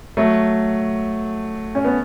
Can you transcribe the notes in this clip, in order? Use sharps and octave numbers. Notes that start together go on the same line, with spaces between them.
F#3 A3
C#4
B3